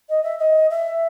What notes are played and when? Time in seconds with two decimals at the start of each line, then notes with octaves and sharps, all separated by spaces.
0.09 D#5
0.24 E5
0.39 D#5
0.70 E5